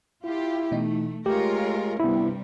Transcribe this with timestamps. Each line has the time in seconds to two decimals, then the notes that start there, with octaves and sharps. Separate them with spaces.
0.24 E4 F4 G4
0.72 B2 E3 A3 D#4
1.26 G#3 A3 F4 G4 A#4 C#5
2.00 G2 C3 G3 B3 E4